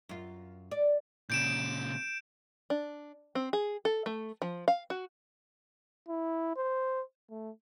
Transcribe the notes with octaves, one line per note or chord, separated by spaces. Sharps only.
F#2 F4
D5
A#2 C#3 G6 D7 E7
D4
C4
G#4
A4
A3
F3
F5
F#4
E4
C5
A3